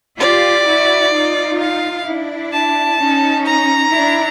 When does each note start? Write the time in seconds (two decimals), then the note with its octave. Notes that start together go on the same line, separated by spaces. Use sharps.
0.19 F4 G4 D5
0.65 E4 F#4
1.13 D#4 F4
1.59 F5
2.06 D4 E4
2.53 A5
2.99 C#4 D#4
3.46 A#5
3.92 D4 E4